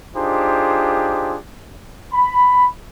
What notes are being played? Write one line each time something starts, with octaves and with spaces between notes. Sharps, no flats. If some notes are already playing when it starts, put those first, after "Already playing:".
D4 D#4 F4 G4 G#4 C5
B5